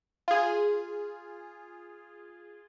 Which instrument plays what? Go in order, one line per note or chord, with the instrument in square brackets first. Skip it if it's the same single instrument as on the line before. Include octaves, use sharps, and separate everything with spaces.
[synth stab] F4 G#4